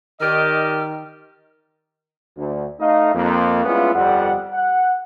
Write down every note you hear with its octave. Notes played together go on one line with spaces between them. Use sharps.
D#3 G4 D5 D#5 F6
D2
A3 D#4 D#5 F5
F2 A#3
G3 G#3 B3 C#4 E4 F4
G1 F2 G3 F#5
F#5